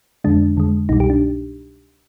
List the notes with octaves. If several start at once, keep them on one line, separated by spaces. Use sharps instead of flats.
F2 D3 G#3 D4
F2 D3 G#3
C2 B2 G3 D#4
G4
D4